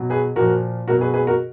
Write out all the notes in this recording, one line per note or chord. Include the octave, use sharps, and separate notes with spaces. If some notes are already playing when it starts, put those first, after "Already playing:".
Already playing: B2 F#3
G#4 B4
A#2 F3 F#4 A#4
B2 F#3 F#4 A#4
G#4 B4
G#4 B4
F#4 A#4